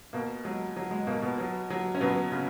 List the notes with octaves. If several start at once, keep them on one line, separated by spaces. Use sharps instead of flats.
B2 A#3
F#3 G#3
F#3
G#3
B2 A#3
B2 B3
F#3
F#3
C#4
B2 F#3 B3
C#3